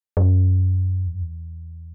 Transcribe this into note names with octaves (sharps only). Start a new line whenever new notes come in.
F#2
E2
F#2
E2